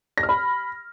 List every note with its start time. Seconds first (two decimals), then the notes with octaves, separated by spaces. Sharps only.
0.17 A#6
0.23 F6
0.29 B5